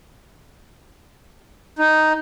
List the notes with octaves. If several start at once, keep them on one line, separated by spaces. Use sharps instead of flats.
D#4